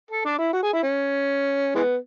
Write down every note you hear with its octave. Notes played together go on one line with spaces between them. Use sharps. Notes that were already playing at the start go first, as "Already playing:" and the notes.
A4
D4
E4
F#4
G#4
E4
C#4
E3 G#3 B3